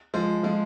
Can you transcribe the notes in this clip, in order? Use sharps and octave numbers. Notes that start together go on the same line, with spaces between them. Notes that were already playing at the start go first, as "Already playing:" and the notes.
F3 G#3
F3 G#3